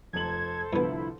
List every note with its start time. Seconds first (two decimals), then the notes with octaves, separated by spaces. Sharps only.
0.13 F1 F2 A4 C5 G#6 F#7
0.73 C2 G2 D3 F3 B3 E4